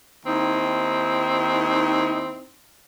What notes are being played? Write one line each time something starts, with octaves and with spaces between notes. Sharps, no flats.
D#2 C4 D#4 E4